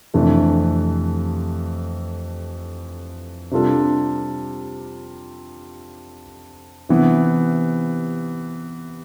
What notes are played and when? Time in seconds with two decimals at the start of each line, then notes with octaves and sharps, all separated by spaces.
0.14 F2 C3 E3 A3 D4
3.51 C3 G3 D4 F4 A4
6.89 C3 E3 B3